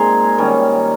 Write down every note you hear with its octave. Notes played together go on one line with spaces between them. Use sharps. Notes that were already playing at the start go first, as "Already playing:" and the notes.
Already playing: A#2 G#3 C4 D#4 G#5 A#5 C6
D#3 G3 C#4